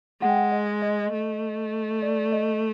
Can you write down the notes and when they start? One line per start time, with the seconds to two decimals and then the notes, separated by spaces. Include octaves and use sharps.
0.21 G#3 F#5
0.29 G5
0.36 F#5
0.52 D#5
0.82 D#5
1.13 A3
2.02 D5
2.32 D#5